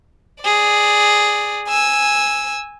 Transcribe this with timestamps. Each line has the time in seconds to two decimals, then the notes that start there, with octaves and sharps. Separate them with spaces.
0.43 G#4 D5
1.68 G#5 E6